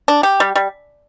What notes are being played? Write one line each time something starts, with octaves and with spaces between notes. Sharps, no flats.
D4
G4
G3
G3